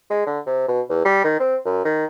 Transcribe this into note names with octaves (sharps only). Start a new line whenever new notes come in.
G#3
D3
C3
B2
E2
G3
D#3
C4
F#2
D#3